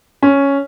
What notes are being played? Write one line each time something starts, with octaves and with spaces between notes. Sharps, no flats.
C#4